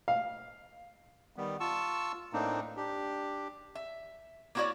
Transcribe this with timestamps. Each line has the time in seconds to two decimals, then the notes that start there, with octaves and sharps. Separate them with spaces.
0.08 F5
1.36 D#3 G3 B3
1.60 F4 A5 C#6 E6
2.33 A2 A#3 C4 D4 D#4
2.77 D4 G4
3.75 E5
4.55 A#3 B3 E4 F#4 C#5 D5